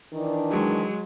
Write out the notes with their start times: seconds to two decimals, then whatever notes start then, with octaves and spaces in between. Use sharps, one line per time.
0.13 D#3 E3 D4
0.51 F#3 G#3